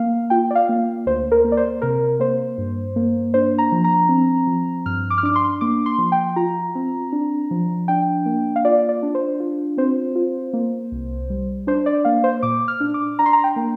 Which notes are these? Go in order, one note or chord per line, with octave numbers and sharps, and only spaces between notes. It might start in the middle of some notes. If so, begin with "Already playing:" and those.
Already playing: A#3 F5
F4 G5
D5
F5
A#3
D2 C5
A#4
A#3
D5
C5
C3 A#4
A#3 C5
G2
A#3
D4 C5
A#5
F3
A#5
C4
F3
G2 F6
D6
F6
D4 D6
C6
A#3 D6
C6
F3
G5
F4 A#5
C4
D4
F3
D4 G5
A#3
F5
F4 D5
D5
D4
C5
F4
C4 C5
F4
A#3
C2
G3
D4 C5
D5
A#3 F5
C5
A#2 D6
F6
D4
D6
D4 A#5
C6
A#5
G5
A#3